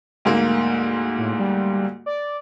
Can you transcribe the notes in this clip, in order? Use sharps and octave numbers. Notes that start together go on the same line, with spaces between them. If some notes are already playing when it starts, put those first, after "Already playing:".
D2 G#2 A#3
A2
G3
D5